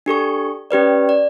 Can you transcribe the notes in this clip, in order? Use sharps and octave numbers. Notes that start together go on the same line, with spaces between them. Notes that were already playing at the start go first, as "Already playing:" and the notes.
D4 G4 A4 C#6
C#4 G4 B4 D5
D5